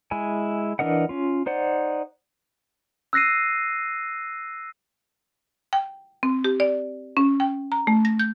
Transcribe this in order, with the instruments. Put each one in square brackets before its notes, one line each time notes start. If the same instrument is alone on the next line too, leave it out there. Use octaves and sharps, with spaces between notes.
[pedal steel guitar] G#3 E4 G#5
E3 D4 A#4 D#5 F#5
C#4 F4
D#4 C5 D5 F#5
[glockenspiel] E6 F#6 A#6 C7 D#7
[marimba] G5
C4
G4
D5
C#4
G5
A#5
A3
A#6
G6